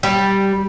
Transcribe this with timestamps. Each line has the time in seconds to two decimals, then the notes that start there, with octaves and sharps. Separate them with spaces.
0.03 G3